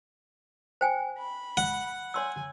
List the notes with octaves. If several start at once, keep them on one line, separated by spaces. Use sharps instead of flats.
C5 G5 G#5
B5
F#5
C#5 G#5 C6 E6